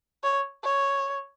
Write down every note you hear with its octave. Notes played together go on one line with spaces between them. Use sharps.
C#5
C#5